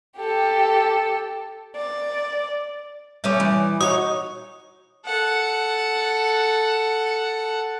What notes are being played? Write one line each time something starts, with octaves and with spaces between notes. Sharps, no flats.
G4 A4
D5
G3 A3 C#4 D6 D#6 G6
E3
D#4 F#4 C#5 D#6
A4 F#5